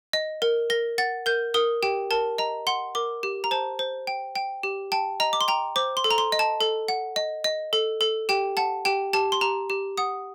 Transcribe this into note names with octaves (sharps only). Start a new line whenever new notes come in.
D#5
A#4
A#4 A#6
F#5 A6
A#4 G6
A#4 D#6
G4 G5
A#4 A5
D#5 A#5
F#5 C6
A#4 D6
G4
A#5
C5 A5
C5
G5
G5
G4
G5 A5
D#5 A#5
D6
C6
G5 A#5
C5 D6
C6
A4
A#5
C6
D#5
A5
A4
F#5
D#5
D#5
A4
A4
G4 G5
F#5 A5
G4 G5
G4 A5
C6
G4 A#5
G4
F#5 D#6